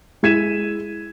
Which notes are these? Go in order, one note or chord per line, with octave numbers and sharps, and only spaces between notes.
G#3 E4 G#6 B6 D#7 E7